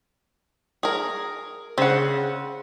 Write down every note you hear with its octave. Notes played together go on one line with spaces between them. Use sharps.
G#4 A#4
C#3 C4 F#5